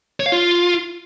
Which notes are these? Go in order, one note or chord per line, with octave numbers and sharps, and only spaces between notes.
C#5
F5
F4